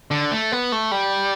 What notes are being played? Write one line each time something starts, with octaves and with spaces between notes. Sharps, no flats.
D3
A3
B3
A3
G3